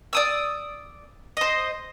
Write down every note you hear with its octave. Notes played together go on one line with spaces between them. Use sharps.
D5 D#6 E6
C5 D#5